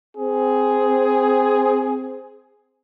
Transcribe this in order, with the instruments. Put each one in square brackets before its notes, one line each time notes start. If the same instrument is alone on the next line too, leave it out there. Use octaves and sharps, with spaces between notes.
[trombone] C4 [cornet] G#4